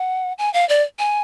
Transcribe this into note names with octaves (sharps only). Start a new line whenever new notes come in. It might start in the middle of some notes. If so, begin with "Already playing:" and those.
Already playing: F#5
G#5
F5
D5
G#5